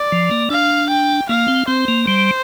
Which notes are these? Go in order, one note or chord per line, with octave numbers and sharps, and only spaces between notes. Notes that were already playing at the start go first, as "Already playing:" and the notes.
Already playing: D5
F3
A#3
D4 F5
G5
A#3 F5
C4
C4 C5
A#3
G3 C5